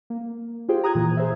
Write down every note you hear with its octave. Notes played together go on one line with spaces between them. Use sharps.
A#3
F4 G4 G#4 C5 G5
A#5 D#6 F#6 G#6
A#2 E3
G#4 C5 E5